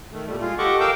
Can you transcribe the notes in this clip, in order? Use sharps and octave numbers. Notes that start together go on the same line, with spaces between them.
D#3 A3
A#2 G3 A3
G#3 F4
G4 A4 D#5 F#5 C#6 D6
A#4 F5 G5 D6 E6 G6